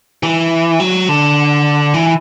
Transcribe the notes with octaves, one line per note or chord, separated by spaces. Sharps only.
E3
F#3
D3
E3